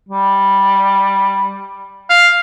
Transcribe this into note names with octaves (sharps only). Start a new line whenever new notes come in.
G3
F5